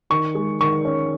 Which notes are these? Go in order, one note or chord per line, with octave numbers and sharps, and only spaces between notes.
D#3 C#6
G#3
D#3 C#6
C#4